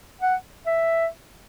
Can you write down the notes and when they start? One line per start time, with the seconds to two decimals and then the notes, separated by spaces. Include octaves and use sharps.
0.22 F#5
0.66 E5